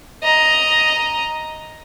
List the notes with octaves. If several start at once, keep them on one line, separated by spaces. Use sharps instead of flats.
D#5 A#5